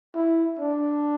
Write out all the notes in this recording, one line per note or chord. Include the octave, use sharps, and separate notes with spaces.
E4
D4